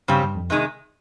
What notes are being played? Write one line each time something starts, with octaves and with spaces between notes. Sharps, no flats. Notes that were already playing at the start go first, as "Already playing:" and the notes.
G2 C#3 G3 C4 G4
G2
F2
C3 D#3 G#3 D#4